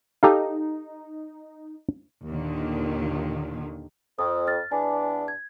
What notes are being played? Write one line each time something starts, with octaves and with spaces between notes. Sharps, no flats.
D#4 G4 A4 F5
D#2 A#2 D3 D#3
F2 D#6
F6 A6
E2 B3 D4 G#5
G#6